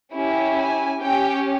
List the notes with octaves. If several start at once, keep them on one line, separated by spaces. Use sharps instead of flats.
C#4 E4 G4
G#5
C#4 G4 G5